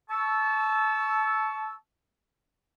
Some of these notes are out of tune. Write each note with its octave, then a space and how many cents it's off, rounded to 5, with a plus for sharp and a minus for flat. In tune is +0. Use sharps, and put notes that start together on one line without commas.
A5 -25 C#6 +10 E6 +0